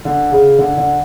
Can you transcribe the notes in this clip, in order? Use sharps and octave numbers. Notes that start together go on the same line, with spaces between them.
D3
C#3
D3
D3